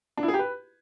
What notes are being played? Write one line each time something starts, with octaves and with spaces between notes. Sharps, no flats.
D4
E4
G#4
G4
B4